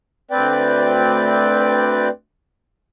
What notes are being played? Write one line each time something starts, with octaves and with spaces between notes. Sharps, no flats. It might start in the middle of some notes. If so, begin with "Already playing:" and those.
D2 C4 B4 D5 G5